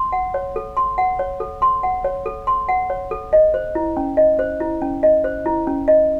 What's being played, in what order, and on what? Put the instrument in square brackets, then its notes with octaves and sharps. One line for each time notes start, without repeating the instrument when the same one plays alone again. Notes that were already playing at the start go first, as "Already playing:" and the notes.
Already playing: [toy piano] C6
F#5
C#5
A4
C6
F#5
C#5
A4
C6
F#5
C#5
A4
C6
F#5
C#5
A4
D#5
C5
E4
C#4
D#5
C5
E4
C#4
D#5
C5
E4
C#4
D#5